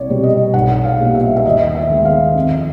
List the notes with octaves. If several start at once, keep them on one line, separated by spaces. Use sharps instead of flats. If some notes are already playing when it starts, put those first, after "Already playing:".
Already playing: C2 C#5 D5
B2 G3 C4
D#5
B1 F#5
F5
A#2 G3 B3
E5
E5
D#2 D#5
E5
D#3 G#3 B3
F5
F2